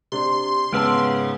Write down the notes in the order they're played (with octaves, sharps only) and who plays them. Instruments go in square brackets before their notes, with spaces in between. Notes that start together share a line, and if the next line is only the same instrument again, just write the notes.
[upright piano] C3 D4 [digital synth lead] C6
[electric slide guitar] G#2 G#3 G5 [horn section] C#3 B3 [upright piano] A5 E6 F6